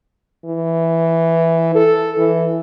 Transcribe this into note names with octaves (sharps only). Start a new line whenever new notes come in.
E3
A4
E3